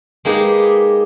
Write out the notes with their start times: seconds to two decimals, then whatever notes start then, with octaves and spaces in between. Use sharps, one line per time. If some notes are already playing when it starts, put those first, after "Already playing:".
0.25 G#3 A#3 D#4 G4 G#4 B4